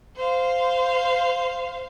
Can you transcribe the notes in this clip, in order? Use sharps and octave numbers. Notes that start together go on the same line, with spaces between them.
C5 F5